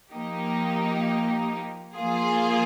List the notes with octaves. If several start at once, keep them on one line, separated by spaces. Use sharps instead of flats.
F3 A#3 D#4 G4
F3 A#3 F4 G#4